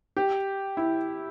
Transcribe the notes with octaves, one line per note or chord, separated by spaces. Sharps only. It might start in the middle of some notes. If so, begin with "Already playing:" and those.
G4
E4